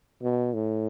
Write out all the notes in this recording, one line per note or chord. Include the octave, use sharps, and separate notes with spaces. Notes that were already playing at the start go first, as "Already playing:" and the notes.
B2
A2